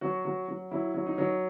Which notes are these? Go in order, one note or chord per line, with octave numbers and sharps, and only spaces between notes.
F#3 F#4
F#3
F#3
F#3 E4
F#3
D#4
F#3